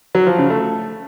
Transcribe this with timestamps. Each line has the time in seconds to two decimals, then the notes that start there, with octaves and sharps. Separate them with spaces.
0.15 F#3
0.26 F3
0.38 C#3
0.50 A3